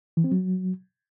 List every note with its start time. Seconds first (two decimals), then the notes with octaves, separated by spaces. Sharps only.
0.17 E3
0.24 C4
0.31 F#3